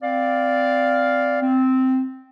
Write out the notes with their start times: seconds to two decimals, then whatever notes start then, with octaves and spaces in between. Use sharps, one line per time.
0.02 C4 D5 F5
1.41 C4